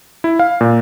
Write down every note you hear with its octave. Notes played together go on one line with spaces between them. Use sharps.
E4
F5
A#2